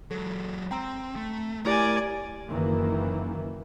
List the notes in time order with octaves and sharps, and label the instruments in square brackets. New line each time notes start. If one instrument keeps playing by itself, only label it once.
[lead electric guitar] F#3 G#3 [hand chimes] A4
[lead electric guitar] C4 [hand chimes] G5 A#5 E6
[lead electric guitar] A3
[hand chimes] A3 E4 G4 [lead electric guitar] A#4 [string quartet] D5 G#5
[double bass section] F#1 D#3 E3 A#3